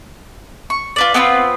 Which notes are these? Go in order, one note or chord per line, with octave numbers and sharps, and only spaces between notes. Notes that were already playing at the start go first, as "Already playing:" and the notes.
C#6
F4 B4 D5
B3 C4 F4 B4